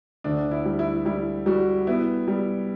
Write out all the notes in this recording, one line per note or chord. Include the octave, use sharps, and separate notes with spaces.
D2 D4
E4
G3
E4
G3 E4
G3 F#4
B3 E4
G3